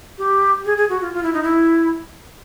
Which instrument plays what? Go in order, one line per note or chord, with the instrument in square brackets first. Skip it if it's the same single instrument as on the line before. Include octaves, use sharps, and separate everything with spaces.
[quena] G4
G#4
G#4
F#4
F4
F4
E4
D#4
E4